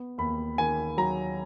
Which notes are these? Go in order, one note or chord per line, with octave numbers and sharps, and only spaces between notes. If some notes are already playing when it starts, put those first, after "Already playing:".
Already playing: B3
D#2 B5
D#3 G#5
F#3 A#5